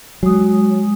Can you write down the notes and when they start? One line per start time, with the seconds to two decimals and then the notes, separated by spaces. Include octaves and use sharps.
0.23 F#3 G#3 D#6